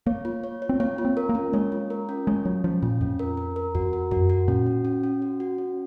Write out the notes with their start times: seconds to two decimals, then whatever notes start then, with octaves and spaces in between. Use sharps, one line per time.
0.07 A#3 C#5
0.25 F4
0.44 C#5
0.62 C#5
0.69 C4
0.80 A#3 C#5
0.98 F4
1.05 C4
1.17 A#4
1.29 A#3
1.35 C#4
1.53 G#3 C#5
1.72 F4
1.90 A#4
2.09 C#4
2.27 G#3 C#5
2.45 F#3 F4
2.64 F3 C#4
2.83 A#2 F4
3.01 F2 C#4
3.19 A#4
3.37 A#4
3.56 A#4
3.75 F2 F#4
3.93 A#4
4.11 F#2 F#4
4.30 F#4
4.48 A#2 C#4
4.66 F#4
4.85 C#4
5.03 C#4
5.22 F#4
5.40 F#4
5.58 C#4